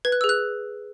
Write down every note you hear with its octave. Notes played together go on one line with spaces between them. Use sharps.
B4 G#6
F#6
G#4 E6
F#6